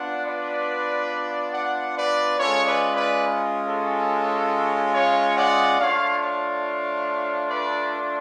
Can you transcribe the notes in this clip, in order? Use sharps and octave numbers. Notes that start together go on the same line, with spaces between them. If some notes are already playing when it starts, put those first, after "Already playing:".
Already playing: B3 D4 F4 F#5
B4 D5
D5 F#5
B4 D5
G#3 C#4 F4 A4 C#5
B4 D5
B4 D5
A4 C#5
C#5 F5
D5 F#5
A3 D4 F4 C#5 F5
C#5 F5
B4 D5